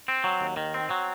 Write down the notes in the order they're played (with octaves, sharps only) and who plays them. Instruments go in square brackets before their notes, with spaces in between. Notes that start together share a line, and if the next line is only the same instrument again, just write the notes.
[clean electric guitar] C4
F#3
D#2
D#3
C4
F#3